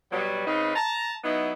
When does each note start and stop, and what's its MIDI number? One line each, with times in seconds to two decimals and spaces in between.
0.12 0.44 47
0.12 0.44 54
0.12 0.44 55
0.12 0.44 59
0.46 0.71 49
0.46 0.71 60
0.46 0.71 63
0.46 0.71 71
0.76 1.14 81
0.76 1.14 82
1.23 1.52 54
1.23 1.52 59
1.23 1.52 63
1.23 1.52 64